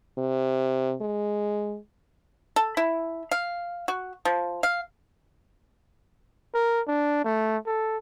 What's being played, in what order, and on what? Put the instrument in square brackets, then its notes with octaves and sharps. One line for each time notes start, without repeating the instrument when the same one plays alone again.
[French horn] C3
G#3
[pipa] A4
E4
F5
F#4
F3
F5
[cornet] A#4
D4
A3
A4